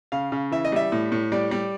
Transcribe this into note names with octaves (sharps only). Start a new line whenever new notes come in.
C#3 F5
C#3
E3 E5
D#5
G3 E5
A2
A2
G3 D5
G3